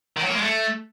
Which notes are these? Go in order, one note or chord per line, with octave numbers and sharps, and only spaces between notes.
D#3
F#3
A#3
G#3
A3